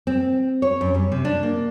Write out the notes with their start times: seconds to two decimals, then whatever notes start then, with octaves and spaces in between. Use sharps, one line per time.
0.07 C4
0.62 C#5
0.81 F#2
0.94 G3
1.12 C3
1.25 D4
1.43 A#3